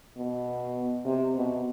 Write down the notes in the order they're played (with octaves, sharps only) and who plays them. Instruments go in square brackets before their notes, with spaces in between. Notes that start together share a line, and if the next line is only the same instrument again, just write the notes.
[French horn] B2
C3
B2